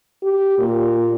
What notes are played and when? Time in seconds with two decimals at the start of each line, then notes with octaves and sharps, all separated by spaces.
0.23 G4
0.59 A#2